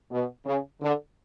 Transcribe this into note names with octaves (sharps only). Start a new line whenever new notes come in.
B2
C#3
D3